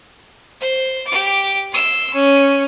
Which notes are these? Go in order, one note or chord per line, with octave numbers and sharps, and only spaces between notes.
C5
G4 D6
C6 E6
C#4